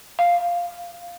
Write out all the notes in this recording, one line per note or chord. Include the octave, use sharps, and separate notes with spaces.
F5